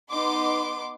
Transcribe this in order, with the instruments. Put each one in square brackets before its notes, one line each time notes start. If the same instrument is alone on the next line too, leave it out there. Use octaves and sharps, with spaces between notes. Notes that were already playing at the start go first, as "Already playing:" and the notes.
[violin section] B3 D#4 C6 D6